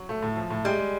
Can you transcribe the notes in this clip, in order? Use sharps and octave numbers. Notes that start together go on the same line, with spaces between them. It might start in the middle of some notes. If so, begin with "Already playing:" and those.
Already playing: F#3
A3
A2
F3
A2
G3 G#3
G#3